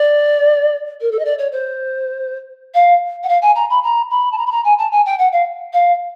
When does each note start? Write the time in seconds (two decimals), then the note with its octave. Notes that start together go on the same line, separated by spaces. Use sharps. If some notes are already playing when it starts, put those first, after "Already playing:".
Already playing: D5
1.01 A#4
1.11 A4
1.19 D#5
1.25 D5
1.38 C#5
1.52 C5
2.74 F5
3.23 F#5
3.29 F5
3.42 G#5
3.55 A#5
3.70 B5
3.83 A#5
4.10 B5
4.32 A5
4.38 A#5
4.46 B5
4.51 A#5
4.64 G#5
4.78 A5
4.92 G#5
5.06 G5
5.18 F#5
5.32 F5
5.73 F5